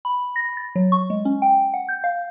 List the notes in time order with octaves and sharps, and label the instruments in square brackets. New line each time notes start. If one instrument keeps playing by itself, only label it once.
[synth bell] B5
A#6
A6
F#3
C#6
G#3
C#4
G5
F#5
G6
F5